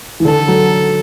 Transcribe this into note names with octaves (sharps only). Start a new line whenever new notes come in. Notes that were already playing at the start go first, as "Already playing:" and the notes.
E3
D3 A4
F#3